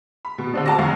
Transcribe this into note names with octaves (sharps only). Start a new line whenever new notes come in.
B5
B2
D3 C4 D4
F#4 A5 A#5 C#6 D6 A#6
C2 F2 D3 F5 C#6